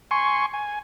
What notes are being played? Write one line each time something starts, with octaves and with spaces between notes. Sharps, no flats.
G#5 C6 C#6
G#5